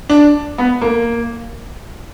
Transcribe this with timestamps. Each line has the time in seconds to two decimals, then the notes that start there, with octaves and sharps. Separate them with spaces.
0.10 D4
0.58 B3
0.81 A#3